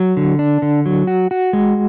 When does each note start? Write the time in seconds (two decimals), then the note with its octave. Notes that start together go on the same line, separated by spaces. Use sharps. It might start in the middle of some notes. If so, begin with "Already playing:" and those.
Already playing: F#3
0.17 D3
0.39 D4
0.62 D3
0.86 F#3
1.07 F#4
1.31 F#4
1.53 G#3